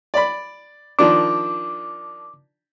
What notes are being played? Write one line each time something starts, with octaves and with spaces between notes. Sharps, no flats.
D5 B5
D#3 F3 D4 D6